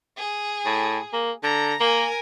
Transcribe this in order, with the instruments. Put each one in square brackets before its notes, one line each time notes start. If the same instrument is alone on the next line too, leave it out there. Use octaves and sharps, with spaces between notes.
[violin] G#4
[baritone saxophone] A2
A#3
[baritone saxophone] D3 [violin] A#5
[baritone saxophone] A#3 [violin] A#4 G#5